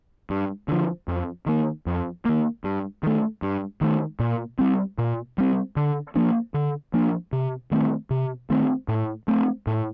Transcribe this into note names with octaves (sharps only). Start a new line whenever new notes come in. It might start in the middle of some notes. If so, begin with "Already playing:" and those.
G2
D3 F3
F2
D#3 A#3
F2
D#3 A#3
G2
D#3 A3
G2
D#3 A3
A#2
G3 C4
A#2
G3 C4
D3
F3 A#3 D4
D3
F3 A#3 D4
C3
D#3 A3 C4
C3
D#3 A3 C4
A2
A3 C4
A2